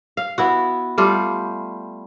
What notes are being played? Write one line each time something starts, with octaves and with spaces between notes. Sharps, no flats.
F5
B3 E4 F#4
G3 A3 F4 G4